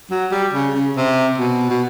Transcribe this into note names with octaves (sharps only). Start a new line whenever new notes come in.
F#3
G3
C#3
C#3
C3
B2
B2